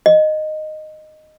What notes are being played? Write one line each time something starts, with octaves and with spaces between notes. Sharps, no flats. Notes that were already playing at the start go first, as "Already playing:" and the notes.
D#5